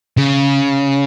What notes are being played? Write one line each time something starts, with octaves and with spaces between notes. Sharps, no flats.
C#3